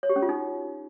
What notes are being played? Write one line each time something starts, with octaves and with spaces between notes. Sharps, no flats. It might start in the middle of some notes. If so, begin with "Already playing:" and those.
C#5
G4
C#4
F4
D#4